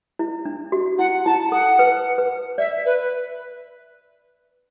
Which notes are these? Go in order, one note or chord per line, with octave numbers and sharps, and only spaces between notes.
E4
D4
F#4
E4 F#5
E4 A5
A4 F#5
B4
B4
D5 E5
B4